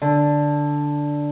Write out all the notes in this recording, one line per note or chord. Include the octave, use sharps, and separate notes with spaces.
D3